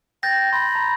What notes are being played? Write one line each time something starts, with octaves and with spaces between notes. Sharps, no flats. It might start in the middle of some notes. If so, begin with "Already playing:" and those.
G5 G6 A6 A#6
B5 C6
A#5